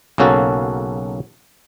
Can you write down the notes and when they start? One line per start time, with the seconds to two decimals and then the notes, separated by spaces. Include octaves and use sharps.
0.18 B1 C#3 A#3 C#4 F#4 A4